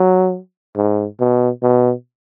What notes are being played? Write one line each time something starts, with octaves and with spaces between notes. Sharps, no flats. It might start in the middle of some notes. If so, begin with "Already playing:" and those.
Already playing: F#3
G#2
B2
B2